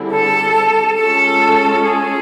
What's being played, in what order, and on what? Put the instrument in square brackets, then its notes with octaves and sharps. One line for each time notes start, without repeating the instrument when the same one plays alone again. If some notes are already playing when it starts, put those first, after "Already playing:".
Already playing: [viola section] D3 G3 C4 E4 G#4
[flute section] A4
[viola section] G#3 C#4 F4 [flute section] A4
[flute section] G#4